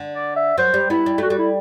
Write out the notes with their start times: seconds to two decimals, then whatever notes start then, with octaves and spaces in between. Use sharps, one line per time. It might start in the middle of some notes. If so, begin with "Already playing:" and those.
Already playing: D3
0.15 D5
0.36 E5
0.58 F#3 C5
0.74 G3
0.90 B3 E4
1.06 G3
1.18 A3 F#4
1.30 G3 F#4
1.38 E4